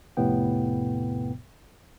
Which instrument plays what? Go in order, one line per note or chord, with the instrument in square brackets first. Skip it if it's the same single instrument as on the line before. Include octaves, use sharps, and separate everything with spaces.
[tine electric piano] A#1 F2 A2 C3 B3 G5